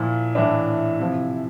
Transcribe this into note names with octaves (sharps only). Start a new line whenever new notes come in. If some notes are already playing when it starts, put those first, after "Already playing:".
Already playing: A#2 F3 E4
A2 E3 D4
C3 F3 E4